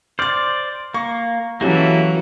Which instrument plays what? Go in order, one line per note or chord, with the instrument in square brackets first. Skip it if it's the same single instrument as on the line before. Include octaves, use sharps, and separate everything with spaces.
[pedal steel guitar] C5 D5 [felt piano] F6 A6
[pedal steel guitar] A#3 [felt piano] C#6
[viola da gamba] E3 F#3 [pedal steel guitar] A#3 F#4 A4 [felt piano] C#4 E4 G4